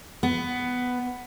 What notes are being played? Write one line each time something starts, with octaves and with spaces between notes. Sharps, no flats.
B3